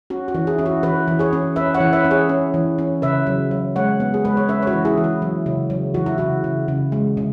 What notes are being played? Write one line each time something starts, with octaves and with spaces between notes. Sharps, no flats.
C#4 F#4
F#4
E3
E4 G#4
C#4 E4
F#4
E3 F#4 B4
E3
G#4 C#5
C#4
C#4 B4 E5
C#5 F#5
E3
B4 E5
C#4
G#4 C#5
C#4
E3
C#4
C#3 B4 E5
F#3
F#3
G#3 C#5 F#5
B3
G#4
G#3 B4
C#5
C#4 B4 E5
C#5
F#4 B4
E3
E4 G#4
E3
E4
F#3
C#3
F#3
E3 F#4
E4
C#3 F#4
C#3
C#3
G#3
C#3